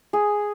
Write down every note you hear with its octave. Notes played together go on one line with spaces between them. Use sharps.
G#4